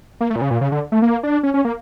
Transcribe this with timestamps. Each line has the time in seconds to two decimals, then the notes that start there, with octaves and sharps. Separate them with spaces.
0.21 A#3
0.30 A3
0.36 A#2
0.41 C#3
0.51 A#2
0.61 C#3
0.72 D3
0.92 A3
1.02 A#3
1.23 D4
1.43 C#4
1.54 C#4
1.65 A#3